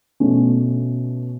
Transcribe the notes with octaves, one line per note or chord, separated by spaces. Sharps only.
B2 A3 C#4